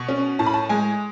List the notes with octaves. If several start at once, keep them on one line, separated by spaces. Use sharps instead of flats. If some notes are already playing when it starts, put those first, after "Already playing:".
Already playing: B2 C#6
C#4
A2 A5
B5
A5
G#3 G#5